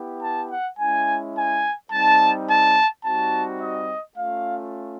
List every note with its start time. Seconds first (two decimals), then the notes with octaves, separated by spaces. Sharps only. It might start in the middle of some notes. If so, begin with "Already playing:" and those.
Already playing: B3 E4 G4
0.23 A5
0.51 F#5
0.79 G#3 C#4 E4 G#5
1.35 G#5
1.92 G3 C4 D#4 A5
2.49 A5
3.05 G3 C4 D#4 F#4 A5
3.61 D#5
4.17 A3 C#4 F4 F5